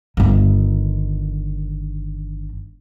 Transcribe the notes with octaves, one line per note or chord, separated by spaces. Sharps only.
G1 D#3